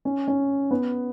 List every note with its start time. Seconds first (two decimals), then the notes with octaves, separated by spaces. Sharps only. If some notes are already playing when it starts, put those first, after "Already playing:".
0.05 C#4
0.28 C#4
0.71 B3